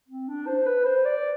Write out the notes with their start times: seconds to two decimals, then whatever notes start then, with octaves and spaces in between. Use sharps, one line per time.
0.08 C4
0.28 D4
0.47 C5
0.66 B4
0.85 C5
1.05 D5